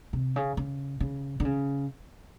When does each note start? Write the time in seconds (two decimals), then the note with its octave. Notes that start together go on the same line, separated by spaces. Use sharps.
0.13 C3
0.36 C#3
0.57 C#3
1.00 C#3
1.40 D3
1.45 C#3